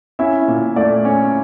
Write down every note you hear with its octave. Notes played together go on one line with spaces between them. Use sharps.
C#4 E4 E5
A#2
A3 D5
C#4